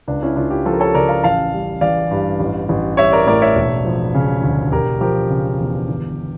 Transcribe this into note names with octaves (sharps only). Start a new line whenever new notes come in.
C#2 D4
C#4 E4
C#2 D4 F4
E4 G4
F3 F4 A4
A#4
A4 C#5
C#3 A#4 D5
F5 A5
A1 F5 A5
G3
E3 D5 F5
G2
A1
A1
G3 C#5 E5
A#4 D5
A2 A#4 D5
C#5 E5
E1
F3
C#3
D2
E1 G4 A#4
F3 G4 A#4
C#3
E2
G1